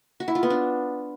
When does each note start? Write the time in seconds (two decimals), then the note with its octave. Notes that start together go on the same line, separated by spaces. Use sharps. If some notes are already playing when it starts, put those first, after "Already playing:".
0.20 F#4
0.28 E4
0.35 F4
0.43 B3
0.50 D4